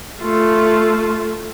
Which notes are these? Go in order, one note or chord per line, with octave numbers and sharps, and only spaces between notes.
A3 F4